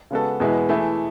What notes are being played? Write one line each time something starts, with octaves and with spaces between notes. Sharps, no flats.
C#3 G#3 B3 F#4 A4
E2 B2 G#3 B3 E4
E3 A3 E4 G#4